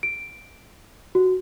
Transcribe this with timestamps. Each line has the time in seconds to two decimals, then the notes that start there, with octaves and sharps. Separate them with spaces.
0.03 D7
1.15 F#4